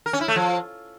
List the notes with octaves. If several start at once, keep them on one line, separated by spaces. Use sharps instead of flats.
A#4
C#4
E4
A3
F3